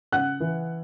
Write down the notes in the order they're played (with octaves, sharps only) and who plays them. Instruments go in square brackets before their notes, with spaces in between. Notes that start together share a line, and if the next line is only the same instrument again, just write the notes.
[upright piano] C#3 F#5 F#6
E3